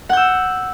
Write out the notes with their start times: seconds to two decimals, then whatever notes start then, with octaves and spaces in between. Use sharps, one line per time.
0.09 F#5
0.13 G6
0.17 E6